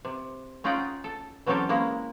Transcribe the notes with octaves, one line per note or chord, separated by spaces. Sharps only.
C3
C#4 D#4 F4 G#4 F#5 G5
A4
E3 F#3 C4 C#4 G4 A4
G#3 A#3 C#4 E4